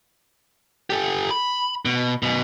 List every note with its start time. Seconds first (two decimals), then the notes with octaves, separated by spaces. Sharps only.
0.90 G4 A4
1.30 B5
1.85 B2
2.23 F#2 B2